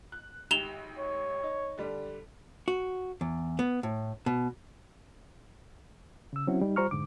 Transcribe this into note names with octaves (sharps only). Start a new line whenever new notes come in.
F#6
G#1 G4 E7 F7 G7
C#5
D#4
D3 G3 D4
F#4
E2
B3
A2
B2
C#3 E6
F#3 C4 C#4 E4 F#4
G3 D#4
G3 F4 C5 A#5 C#6 F6
F2 G#2 D3 D6